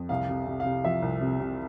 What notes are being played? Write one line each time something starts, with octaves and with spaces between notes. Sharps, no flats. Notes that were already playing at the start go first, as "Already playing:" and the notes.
Already playing: F2
C2 F5
C3
C3
C3 F5
F3 E5
C2
C3
C3